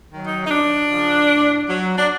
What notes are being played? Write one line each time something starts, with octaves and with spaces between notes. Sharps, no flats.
D#3 F#3
D#4
D#4
F#2 D4
C#3 F3
A2
F#3
D4